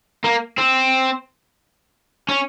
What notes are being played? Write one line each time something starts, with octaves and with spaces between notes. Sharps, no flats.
A#3
C4
C#4